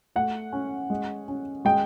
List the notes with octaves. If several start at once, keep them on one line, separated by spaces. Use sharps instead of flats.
A3 F#5
C#4
G#3
C#4
G#3 G5